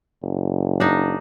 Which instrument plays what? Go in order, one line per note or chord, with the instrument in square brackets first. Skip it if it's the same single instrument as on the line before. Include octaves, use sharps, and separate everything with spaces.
[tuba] F#1
[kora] D4 D#4